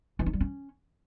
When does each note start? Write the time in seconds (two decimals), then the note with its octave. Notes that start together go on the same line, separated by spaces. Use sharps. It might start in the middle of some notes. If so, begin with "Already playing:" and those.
0.19 E3
0.26 D#4
0.33 G3
0.41 C#4